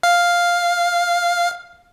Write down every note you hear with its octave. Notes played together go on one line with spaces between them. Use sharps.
F5